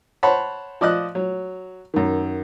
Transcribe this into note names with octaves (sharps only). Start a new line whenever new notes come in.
C5 C#5 F#5 A5 B5
F3 D5 D#5 F#6
F#3
F#2 D#3